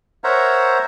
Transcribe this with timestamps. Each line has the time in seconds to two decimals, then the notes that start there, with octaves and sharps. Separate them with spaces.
0.24 A#4 C5 C#5 E5 F#5 A#5